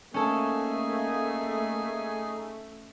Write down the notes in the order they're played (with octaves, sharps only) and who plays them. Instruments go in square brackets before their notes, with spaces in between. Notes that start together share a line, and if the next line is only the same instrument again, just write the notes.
[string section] A3 [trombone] A#3 [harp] C#4 A4 [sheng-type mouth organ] D#4 G#4 G#5